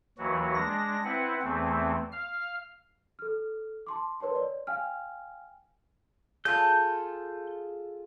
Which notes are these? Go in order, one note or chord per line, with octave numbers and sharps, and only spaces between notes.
D#2 E3 F#3 F#4
G#3 D4 A#6
C4 E4 B4 F#5
E2 E3 A3 C4
F5 F6
A4 F6
A5 C6 D6
A#4 B4 C#5 A5 C6
C#5 D5
F5 G5 G#5 F6
F4 G#4 A4 G6